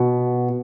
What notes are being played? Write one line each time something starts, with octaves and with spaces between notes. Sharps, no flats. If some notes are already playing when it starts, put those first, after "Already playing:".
Already playing: B2